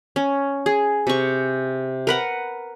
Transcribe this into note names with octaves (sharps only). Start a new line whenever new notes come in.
C#4
G#4
C3 C#6
A#4 B4 F#5